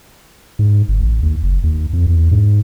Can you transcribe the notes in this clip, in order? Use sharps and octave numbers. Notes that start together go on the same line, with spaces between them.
G#2
G1
A1
D#2
F#1
D#2
F2
E2
G#2